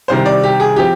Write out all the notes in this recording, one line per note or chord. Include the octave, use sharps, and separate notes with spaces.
C2 C3 D#3 G3 C4 C5
D5
G4
G#4
F3 C4 G4